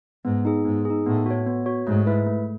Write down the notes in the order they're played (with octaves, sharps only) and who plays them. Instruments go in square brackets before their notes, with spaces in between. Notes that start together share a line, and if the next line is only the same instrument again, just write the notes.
[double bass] G#2 [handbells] B3
[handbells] D#4 G#4
[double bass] G#2 [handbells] B3
[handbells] G#4
D#4
[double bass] A2 [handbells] B3
[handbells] F#4 C#5
B3
F#4 C#5
[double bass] G#2 [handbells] A3
[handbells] E4 B4 E5
A3